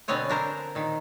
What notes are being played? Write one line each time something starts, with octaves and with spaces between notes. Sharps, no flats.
B2 D3 B3 C4 C#5 G#5
D4 A#4 C5
A#2 D#3